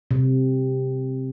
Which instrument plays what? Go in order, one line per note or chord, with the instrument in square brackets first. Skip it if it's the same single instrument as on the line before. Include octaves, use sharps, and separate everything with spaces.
[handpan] C3